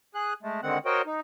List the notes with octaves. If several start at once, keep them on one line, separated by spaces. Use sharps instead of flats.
G#4 F#6
G#3 A3
D3 D#3 G#3 C4 F#5
F#4 A#4 C5 C#5 D#5 G5
D#4